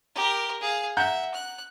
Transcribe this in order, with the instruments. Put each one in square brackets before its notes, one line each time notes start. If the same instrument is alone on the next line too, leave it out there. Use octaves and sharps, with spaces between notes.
[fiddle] G4 A#4
G#4 F5
[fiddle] E5 [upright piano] F#5 A#5 G6
[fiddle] F#6